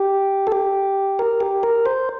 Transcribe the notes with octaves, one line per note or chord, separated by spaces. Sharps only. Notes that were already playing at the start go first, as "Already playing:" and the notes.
Already playing: G4
A4
G4
A#4
G4
A#4
C5